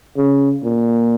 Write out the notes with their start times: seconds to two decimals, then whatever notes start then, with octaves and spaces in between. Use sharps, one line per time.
0.18 C#3
0.64 A#2